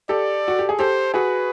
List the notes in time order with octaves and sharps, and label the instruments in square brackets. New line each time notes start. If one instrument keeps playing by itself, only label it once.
[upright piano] G4 A4 [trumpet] D5
[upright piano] F#4
G4
G#4
[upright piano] G4 A4 [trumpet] C5
[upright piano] F#4 G#4 [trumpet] B4